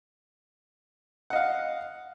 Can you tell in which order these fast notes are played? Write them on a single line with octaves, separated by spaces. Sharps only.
F#5 D#5 F5